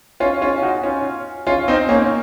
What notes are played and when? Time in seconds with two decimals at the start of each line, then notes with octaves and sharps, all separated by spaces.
0.20 C#4 F4
0.41 C#4 F4
0.62 D#4 F#4
0.84 C#4 F4
1.47 C#4 F4
1.68 C4 D#4
1.89 A#3 C#4